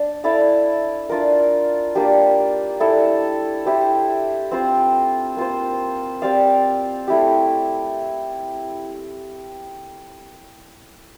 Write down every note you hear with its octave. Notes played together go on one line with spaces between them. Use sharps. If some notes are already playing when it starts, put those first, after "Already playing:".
Already playing: D4
E4 A4 D5 F5
D4 F4 A#4
A#3 D4 G4
A3 E4 A4 D5
E4 G4 C5
C4 F4 C5
A#3 F4 C5
C4 G4 D5 F5
A3 E4 G4